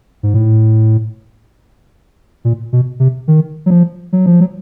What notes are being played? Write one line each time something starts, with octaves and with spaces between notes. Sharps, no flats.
G#2
A2
A#2
B2
C3
D#3
F#3
F3
F#3
F3
F#3